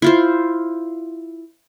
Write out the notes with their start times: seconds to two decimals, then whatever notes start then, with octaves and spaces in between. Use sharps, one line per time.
0.02 E4 F4 C5